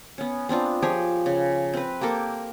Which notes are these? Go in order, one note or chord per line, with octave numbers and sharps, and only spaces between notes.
B3 C#4
B3 C4 D4 F4
F3 G4 G#4 C#5
C#3
C4 B4
A#3 G4 A4 A#4